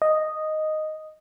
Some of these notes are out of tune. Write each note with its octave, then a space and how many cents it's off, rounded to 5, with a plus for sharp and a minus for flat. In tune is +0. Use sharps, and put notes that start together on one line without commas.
D#5 -5